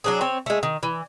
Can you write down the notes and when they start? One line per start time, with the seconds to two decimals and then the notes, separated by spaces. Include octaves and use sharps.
0.04 F#3 D4 G#4
0.21 C4 C#5
0.46 G#3 A3
0.63 D#3
0.83 E3